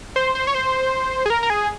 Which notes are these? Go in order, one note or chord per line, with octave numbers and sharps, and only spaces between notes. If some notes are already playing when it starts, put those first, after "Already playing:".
C5
C5
C#5
C5
G#4
A#4
A#4
G#4